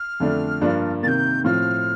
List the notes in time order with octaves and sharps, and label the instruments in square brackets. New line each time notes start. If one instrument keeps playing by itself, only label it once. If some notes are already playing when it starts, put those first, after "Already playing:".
Already playing: [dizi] F6
[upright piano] F2 D3 A3 D4
G2 F3 A#3 D4
[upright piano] C3 D#3 A#3 [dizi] G6 A6
[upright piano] A2 F3 C4 [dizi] F6